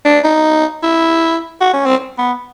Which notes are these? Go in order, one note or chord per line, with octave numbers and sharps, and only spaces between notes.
D4
D#4
E4
F#4
C#4
C4
B3